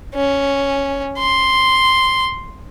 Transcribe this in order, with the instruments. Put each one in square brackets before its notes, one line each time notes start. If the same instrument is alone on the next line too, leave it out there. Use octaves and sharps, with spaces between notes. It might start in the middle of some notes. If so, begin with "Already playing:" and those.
[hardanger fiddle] C#4
C6